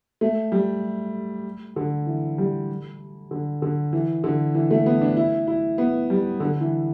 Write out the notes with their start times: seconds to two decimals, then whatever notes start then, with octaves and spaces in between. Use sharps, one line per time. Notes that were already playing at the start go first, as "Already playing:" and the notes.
0.21 A3
0.52 G3
1.76 D3
2.07 E3
2.38 G3
3.31 D3
3.62 D3
3.93 E3
4.24 D3
4.55 E3
4.71 A3
4.86 B3
5.01 D4
5.17 E4
5.47 E4
5.78 B3
6.10 G3
6.40 D3
6.61 E3